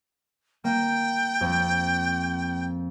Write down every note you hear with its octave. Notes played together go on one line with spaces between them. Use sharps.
A#3 G5
F2